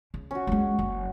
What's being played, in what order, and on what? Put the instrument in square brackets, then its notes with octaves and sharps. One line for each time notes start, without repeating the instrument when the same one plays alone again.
[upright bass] C#3
[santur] C#4 F#4
[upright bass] G3 G#3
F#1